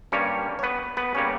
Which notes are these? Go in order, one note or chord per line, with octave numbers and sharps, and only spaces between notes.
G2 G3 A#3 C#4 C#5
C#5
B3 B4
B3 B4
C#3 G3 A#3 C#4 C#5